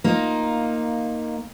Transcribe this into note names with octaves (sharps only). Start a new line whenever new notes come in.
A#3 D#4 F4